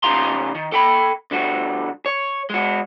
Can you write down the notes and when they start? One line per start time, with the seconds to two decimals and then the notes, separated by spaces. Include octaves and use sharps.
0.03 C#3 D#4 G4 F5 A#5 C6
0.55 D#3
0.72 A4 G5 B5
1.31 D3 G3 F#4
2.06 C#5
2.50 G#3 F#4